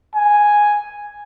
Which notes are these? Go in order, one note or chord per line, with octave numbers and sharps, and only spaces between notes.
G#5